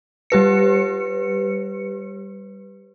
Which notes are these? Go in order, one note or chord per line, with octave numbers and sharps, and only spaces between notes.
G3 G4 B4 C#7